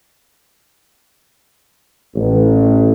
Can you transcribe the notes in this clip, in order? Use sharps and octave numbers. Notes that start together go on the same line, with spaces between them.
A1